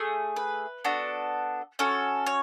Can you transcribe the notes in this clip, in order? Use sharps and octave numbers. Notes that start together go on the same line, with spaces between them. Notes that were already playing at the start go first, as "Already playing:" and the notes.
Already playing: A3 G#4
B4
B3 D4 F#4 A4
C#4 F#4 A4
C#5